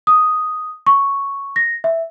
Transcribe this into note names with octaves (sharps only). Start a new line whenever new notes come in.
D#6
C#6
A#6
E5